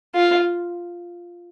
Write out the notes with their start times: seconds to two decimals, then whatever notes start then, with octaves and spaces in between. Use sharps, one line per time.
0.14 F4